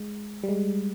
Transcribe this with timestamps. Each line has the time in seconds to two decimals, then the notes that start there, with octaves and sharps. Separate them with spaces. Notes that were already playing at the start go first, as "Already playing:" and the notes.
Already playing: G#3
0.43 G3
0.49 G#3